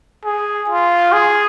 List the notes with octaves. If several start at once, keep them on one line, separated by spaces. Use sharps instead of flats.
G#4
F4
G#4